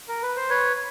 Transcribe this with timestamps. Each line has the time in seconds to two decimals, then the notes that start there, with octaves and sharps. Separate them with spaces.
0.08 A#4
0.23 B4
0.36 C5
0.49 B4 C#5